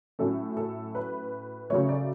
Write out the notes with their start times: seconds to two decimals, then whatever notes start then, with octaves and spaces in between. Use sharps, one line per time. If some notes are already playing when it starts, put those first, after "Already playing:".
0.19 A2 F#3 A3 C#4 A4
0.57 A4
0.95 B4
1.70 C#3 F#3 A3 C#5
1.89 D5